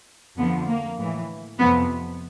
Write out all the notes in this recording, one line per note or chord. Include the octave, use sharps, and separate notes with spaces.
F2 D3 F3 B3
A#3
A2 E3
F2 C3 F3 B3